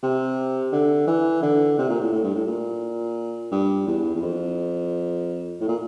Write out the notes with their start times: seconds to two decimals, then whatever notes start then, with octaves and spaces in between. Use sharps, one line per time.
0.03 C3
0.72 D3
1.07 E3
1.42 D3
1.78 C3
1.89 A#2
2.00 A2
2.12 A2
2.23 G2
2.35 A2
2.47 A#2
3.51 G2
3.87 E2
4.15 E2
4.22 F2
5.60 A2
5.68 A#2